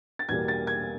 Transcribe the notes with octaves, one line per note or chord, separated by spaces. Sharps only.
A6
E2 B2 G3 A#3 G#6
A6
G#6